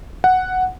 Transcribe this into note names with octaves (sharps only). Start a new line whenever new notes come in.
F#5